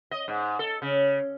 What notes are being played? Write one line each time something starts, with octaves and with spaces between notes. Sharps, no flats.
D#5
G#2
A4
C#3